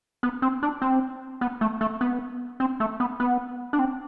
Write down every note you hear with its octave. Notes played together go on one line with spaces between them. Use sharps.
B3
C4
D4
C4
B3
A3
A3
B3
C4
A3
B3
B3
D4
C4